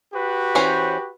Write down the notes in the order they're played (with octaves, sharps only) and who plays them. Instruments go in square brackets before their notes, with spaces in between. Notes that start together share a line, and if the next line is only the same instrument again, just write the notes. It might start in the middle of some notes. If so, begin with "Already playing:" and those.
[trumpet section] F#4 G4 B4
[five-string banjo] E3 C#4 C5